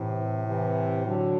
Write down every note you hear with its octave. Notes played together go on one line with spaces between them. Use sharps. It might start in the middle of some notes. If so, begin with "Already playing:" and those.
Already playing: A2 C3 E3
C3 E3
D3 F#3